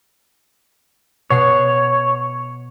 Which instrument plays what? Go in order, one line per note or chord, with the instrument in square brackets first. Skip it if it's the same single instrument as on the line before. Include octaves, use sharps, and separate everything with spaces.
[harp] B2 F#5 C7 [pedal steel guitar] C#5